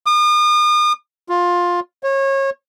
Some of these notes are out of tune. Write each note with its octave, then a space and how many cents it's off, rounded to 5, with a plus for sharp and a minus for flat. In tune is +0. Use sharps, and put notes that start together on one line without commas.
D#6 -40
F4 +15
C#5 -30